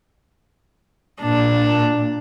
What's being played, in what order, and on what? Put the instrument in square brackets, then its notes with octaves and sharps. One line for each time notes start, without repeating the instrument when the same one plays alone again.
[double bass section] A#2 [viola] D4